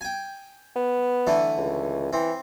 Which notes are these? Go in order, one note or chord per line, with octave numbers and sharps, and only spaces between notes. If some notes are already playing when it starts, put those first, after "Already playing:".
G5 G#5
B3
D3 E3 A3
C#2
E3 C4